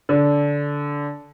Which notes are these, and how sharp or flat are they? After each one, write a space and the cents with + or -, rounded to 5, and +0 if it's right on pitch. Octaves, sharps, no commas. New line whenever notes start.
D3 -15